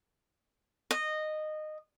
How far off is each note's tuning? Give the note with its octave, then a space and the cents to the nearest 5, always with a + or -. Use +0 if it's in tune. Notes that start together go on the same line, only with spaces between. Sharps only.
D#5 -15